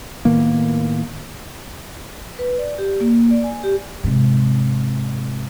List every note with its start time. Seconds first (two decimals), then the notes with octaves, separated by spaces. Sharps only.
0.25 A2 D#3 A#3 B3
2.39 B4
2.58 D5
2.78 G4
3.01 A#3
3.31 D5
3.44 G#5
3.64 G4
4.04 G#2 C3